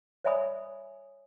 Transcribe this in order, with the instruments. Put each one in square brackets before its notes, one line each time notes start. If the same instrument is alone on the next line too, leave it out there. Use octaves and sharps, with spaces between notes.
[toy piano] C#5 D5 E5 G#5 B5 D#6